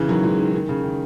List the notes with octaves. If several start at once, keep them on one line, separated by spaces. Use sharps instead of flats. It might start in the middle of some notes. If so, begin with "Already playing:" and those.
Already playing: C#3 E3
D#3 F#3
E3 G#3
D#3
D#3
C#3
D#3